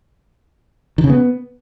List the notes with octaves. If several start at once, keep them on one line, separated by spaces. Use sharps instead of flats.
D#3
C#3
B3